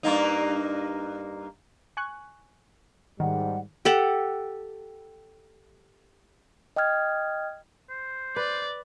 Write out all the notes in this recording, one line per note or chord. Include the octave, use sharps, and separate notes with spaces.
G2 A#3 D#4
G#5 C#6 F#6
G#2 D#3 G3 F#5
G4 A4 F#5
D#5 G5 D#6 F6 G#6
C5
B4 D5